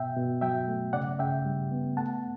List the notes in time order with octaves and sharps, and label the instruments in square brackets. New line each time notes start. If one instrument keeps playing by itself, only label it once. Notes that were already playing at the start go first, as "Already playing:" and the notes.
Already playing: [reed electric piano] B2 E5 G5
B2
F#3 E5 G5
A3
C#3 D5 F#5
C#3 E5 G5
G3
B3
A3 F#5 A5